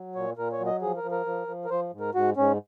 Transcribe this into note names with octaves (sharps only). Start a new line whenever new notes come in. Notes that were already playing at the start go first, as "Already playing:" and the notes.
Already playing: F#3
A#2 C#5
A#2 A#4
C#5
F#3
D#5
F3 G#4
A#4
F3
A#4
F3
F3
A#4
F3 C5
G#2
A#4
G#2 F#4
G#2 C#4